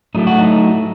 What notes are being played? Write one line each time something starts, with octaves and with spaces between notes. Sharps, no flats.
A2 F#3 A3 D4 D#4
F#4
D#4